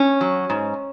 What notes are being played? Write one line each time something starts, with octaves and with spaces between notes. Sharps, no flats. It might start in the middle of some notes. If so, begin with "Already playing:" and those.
Already playing: C#4
F#3
G#2